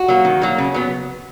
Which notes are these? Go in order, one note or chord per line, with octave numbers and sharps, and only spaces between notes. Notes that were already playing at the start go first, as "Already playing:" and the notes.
Already playing: F#4
F#3 A#3
D#3
F#3 A#3
C#3
F#3 B3